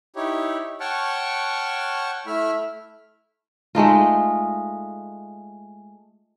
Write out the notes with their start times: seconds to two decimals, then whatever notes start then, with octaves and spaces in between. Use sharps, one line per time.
0.16 D#4 E4 G4 C#5
0.80 C#5 F#5 G5 A5 C#6 F6
2.26 A3 E4 E5 F6
3.75 G#3 A3 D#4 F4